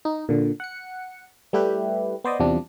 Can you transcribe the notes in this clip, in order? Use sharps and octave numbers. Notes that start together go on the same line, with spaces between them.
D#4
A#2 D3
F#5 C#7
G3 A3 E4 G4 B4
B3 C5 D5 D#5
E2 C3 F3 G3 D4